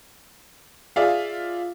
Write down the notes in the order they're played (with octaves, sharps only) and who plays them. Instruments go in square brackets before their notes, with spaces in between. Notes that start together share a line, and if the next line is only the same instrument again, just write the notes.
[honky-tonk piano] F4 G#4 D5 E5 F5